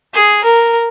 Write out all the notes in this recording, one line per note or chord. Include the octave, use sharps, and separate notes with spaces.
G#4
A#4